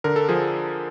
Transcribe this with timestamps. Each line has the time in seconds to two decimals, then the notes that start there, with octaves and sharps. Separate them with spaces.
0.04 D3 A#4
0.16 A4
0.29 F3 G#4